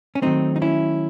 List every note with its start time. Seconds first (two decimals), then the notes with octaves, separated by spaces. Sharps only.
0.15 C#4
0.22 D#3 F#3 A3 C4 D#4
0.56 D#4
0.62 C#4 E4